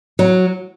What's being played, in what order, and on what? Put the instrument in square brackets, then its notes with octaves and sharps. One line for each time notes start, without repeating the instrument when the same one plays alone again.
[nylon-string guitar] F#3